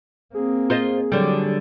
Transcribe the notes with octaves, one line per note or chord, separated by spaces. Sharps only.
A#3 C4 G#4
F4 C5 D#5
D3 F#3 G3